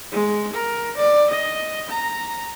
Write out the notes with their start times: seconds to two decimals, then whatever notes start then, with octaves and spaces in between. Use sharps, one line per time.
0.12 G#3
0.54 A#4
0.97 D5
1.30 D#5
1.89 A#5